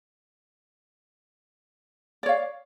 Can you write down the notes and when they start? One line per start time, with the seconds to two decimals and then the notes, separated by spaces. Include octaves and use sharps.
2.23 D5
2.26 C#5
2.29 F5